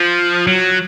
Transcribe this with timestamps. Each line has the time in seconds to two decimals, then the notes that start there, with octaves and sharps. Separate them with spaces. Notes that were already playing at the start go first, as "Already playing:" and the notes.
Already playing: F3
0.47 F#3